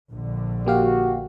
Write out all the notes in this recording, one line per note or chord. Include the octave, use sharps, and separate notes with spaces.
A#1 D3
A#3 F#4 G4 F5